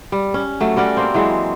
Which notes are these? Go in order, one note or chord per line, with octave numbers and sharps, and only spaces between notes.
G3
C#4
F#3 A3
G3 C#4 F#4 D5
A#3 C4
E3 F#3 G#3